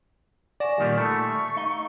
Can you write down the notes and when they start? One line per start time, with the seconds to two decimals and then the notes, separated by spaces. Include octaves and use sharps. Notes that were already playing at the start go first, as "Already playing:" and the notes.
0.60 D5 F#5 G#5 C#6 A#6 E7
0.78 A#2 D#3 G3
0.98 A3 A5 B5 C#6 E6
1.57 D#4 F5 G7